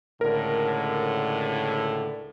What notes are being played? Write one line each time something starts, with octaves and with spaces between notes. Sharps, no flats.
C#2 A2 D3 A#4